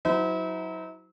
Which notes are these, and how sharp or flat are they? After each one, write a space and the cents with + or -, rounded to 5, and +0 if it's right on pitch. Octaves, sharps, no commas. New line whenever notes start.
F#3 +0 E4 -35 C5 -35